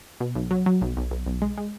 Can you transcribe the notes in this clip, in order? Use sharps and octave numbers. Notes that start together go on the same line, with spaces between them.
B2
B1
F#3
F#3
B1
B1
B1
B1
G#3
G#3